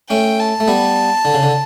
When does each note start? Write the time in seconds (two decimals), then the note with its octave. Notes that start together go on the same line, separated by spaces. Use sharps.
0.10 A3 C#4 G5
0.39 A5
0.60 A3
0.68 G3 B3
1.25 D3
1.34 C#3
1.43 D3